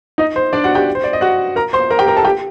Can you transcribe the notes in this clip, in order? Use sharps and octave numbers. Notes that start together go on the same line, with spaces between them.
D#4 D#5
C5
D4 D5
F#4 F#5
G4 G5
C5
D5
D#5
F#4 F#5
A#4 A#5
C5 C6
A#4 A#5
G4 G5
A#4 A#5
A4 A5
G4 G5